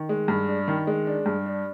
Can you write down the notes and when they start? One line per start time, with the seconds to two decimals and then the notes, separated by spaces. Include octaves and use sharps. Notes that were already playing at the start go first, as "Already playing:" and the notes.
Already playing: D#3
0.09 G#3
0.28 G2
0.48 D4
0.68 D#3
0.87 G#3
1.07 D4
1.26 G2
1.46 D4